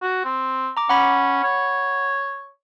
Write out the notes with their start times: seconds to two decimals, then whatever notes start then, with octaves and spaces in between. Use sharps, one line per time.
0.02 F#4
0.24 C4
0.77 A#5 D6
0.89 C#4 F#5 B5
1.43 C#5